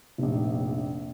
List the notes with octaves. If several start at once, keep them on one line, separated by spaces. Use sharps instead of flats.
F1 A#1